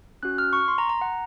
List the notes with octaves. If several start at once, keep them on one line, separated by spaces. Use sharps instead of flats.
C#4 F#4 F#6
F6
C#6
C6
A#5
A#5
F#5